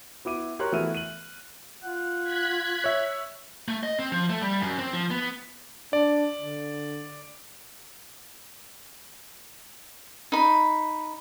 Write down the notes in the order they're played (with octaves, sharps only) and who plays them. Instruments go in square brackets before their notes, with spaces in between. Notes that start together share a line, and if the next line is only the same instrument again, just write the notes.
[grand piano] B3 E4 D6 D#7
G4 A#4 C#5 A#5 C6 F#6
E3 A3 B3 E4 F6 D#7
D#7 F#7
[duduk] F4 [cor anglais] F#5
[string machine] F#6 G#6 B6
[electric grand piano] C#5 E5
[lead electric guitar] A3
D#5
C4
F3
A3
G3
F#2
C4
F3
B3
[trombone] D4 [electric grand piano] D5
[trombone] D3
[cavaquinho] D#4 B5